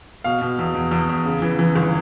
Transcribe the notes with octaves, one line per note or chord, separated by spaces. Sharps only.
B2 F5
B2
E2
E2
E2
E2
C#3
E3
E3
G1